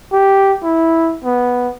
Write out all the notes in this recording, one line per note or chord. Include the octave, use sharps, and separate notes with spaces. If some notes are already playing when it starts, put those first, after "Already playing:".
G4
E4
B3